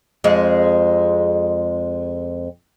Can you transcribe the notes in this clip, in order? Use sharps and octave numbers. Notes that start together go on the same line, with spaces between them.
F2 G#3